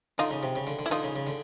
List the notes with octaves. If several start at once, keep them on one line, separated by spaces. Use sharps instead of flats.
D3 D#4 F4
C#3
C3
C#3
D3
D3
E4
D3 D#4 F4
C#3
C#3
D3